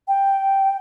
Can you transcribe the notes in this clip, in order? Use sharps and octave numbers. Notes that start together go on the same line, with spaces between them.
G5